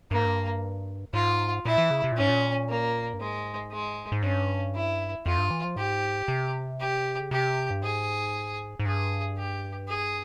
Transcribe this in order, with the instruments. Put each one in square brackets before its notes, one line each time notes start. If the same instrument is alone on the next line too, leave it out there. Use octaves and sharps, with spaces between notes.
[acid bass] G2 [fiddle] A#3
[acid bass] G#2
G2
[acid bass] G#2 [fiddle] F4
[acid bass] A#2 [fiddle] E4
[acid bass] E3
C#3
C3
A#2
[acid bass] G#2 [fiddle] C#4
[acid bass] A#2
[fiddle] A#3
[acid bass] G2
[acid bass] G#2 [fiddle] G#3
[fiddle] G#3
[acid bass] G#2
[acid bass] G2 [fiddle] C#4
[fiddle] E4
[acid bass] F2 [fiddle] F4
[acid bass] G2
E3
F3
[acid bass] G#2 [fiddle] G4
[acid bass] C3
[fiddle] G4
[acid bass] C#3
[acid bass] C3 [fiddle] G4
[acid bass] G2
[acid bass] G#2 [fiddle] G#4
[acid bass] G#2
[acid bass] G2 [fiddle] G#4
[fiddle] G4
G#4